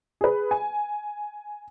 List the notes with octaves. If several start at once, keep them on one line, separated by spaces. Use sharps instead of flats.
G#4 B4
G#5